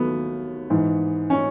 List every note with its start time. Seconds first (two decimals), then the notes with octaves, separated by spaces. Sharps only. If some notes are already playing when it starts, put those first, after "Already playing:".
Already playing: D#2 D#3 F#3 A3 B3
0.70 G#2 E3
1.30 C#4